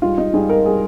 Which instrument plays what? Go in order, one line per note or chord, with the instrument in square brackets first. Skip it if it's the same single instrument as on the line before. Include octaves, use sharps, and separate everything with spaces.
[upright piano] G#2 G3 F4
D#4
G#2 G3 G#4
A#4
G3 G#4